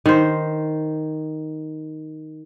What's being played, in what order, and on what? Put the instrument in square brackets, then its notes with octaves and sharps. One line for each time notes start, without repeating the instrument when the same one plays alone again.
[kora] D#3 C5